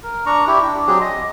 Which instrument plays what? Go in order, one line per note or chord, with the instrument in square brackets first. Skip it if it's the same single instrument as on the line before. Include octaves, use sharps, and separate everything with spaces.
[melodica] A#4
D4 A#5 C#6
E4 G4
D4
F#3 C4 G4 G#4
D#5